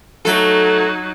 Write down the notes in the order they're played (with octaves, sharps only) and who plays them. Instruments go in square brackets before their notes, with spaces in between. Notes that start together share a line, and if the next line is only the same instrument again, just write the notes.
[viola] F#3 D#4 [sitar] A3 A4